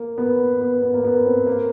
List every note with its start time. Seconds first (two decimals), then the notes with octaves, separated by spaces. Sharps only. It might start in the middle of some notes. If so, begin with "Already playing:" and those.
Already playing: A#3
0.18 B3
0.61 B3
0.82 B3
0.94 A#3
1.04 B3
1.26 C4
1.47 A#3